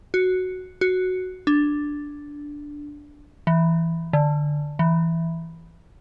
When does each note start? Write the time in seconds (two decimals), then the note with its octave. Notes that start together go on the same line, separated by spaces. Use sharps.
0.14 F#4
0.81 F#4
1.47 D4
3.47 E3
4.13 D3
4.79 E3